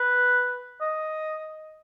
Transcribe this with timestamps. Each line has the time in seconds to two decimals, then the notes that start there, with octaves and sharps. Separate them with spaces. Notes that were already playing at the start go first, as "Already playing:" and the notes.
Already playing: B4
0.81 D#5